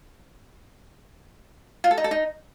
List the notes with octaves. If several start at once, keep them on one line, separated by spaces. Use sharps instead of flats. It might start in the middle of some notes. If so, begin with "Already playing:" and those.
F4
A4
D#4
A4
D#4